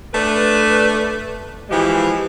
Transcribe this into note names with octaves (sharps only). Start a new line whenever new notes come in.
A3 D4 B4
E3 F3 G#3 G4